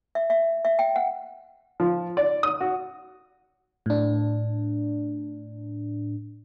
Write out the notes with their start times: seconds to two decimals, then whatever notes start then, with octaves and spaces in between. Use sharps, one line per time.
0.15 E5
0.30 E5
0.65 E5
0.79 G5
0.96 F#5
1.80 F3
2.17 D5
2.43 D#6
2.60 F#4
3.86 A2 D4